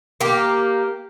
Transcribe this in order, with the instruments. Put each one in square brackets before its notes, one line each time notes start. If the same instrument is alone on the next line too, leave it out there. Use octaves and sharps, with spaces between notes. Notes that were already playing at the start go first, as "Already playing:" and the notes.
[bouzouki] A#3 G4